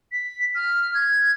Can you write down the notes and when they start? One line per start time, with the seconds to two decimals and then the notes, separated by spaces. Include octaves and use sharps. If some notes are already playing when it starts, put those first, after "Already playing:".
0.12 B6
0.55 F6
0.94 G#6